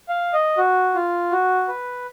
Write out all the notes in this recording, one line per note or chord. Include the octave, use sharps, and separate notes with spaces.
F5
D#5
F#4
F4
F#4
B4